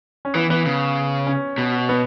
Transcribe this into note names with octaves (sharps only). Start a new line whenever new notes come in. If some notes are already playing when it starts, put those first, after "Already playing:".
C#4
E3 B3
E3 B3
C#3
C#4
B2
B3